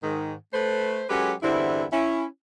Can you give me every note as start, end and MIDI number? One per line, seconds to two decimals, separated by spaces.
0.03 0.35 44
0.03 0.35 51
0.53 1.04 57
0.53 1.04 71
0.53 1.04 72
1.10 1.32 54
1.10 1.32 56
1.10 1.32 61
1.10 1.32 67
1.10 1.32 69
1.10 1.32 71
1.43 1.84 40
1.43 1.84 43
1.43 1.84 50
1.43 1.84 60
1.43 1.84 64
1.93 2.24 61
1.93 2.24 64